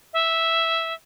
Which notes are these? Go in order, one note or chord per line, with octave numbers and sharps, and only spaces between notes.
E5